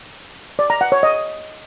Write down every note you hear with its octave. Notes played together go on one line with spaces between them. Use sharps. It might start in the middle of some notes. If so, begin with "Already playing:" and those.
D5
A#5
F#5
C#5
D#5